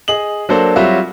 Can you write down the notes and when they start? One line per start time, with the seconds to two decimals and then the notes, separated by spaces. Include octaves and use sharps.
0.08 G#4 D#5 F#7
0.49 F#3 A#3 D4 A4 C5 D5
0.76 F#3 G3 C4 F4 F#4 E5